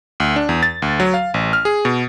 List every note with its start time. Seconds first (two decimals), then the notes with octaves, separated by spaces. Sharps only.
0.20 D2
0.36 D4
0.49 E2
0.63 A6
0.82 D2
1.00 F#3
1.14 F5
1.34 A1
1.53 F6
1.65 G#4
1.85 B2